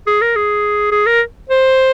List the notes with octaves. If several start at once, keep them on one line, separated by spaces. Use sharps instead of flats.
G#4
A#4
G#4
G#4
A#4
C5